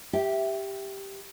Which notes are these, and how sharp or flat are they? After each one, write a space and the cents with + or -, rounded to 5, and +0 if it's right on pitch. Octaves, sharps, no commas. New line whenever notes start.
G4 +0 E5 +0 G5 -35